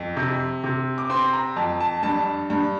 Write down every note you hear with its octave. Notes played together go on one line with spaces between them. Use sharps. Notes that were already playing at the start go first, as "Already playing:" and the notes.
Already playing: F2
C3
C3
D6
C4 C6
A#5
F2 A5
A5
G2 A5
G2